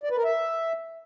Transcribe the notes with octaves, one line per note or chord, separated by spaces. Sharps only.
D5
B4
A#4
E5